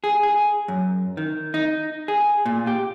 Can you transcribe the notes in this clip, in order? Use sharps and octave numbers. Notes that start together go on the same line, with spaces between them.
G#4
G#4
F#2
D#3
D#4
G#4
A#2
G4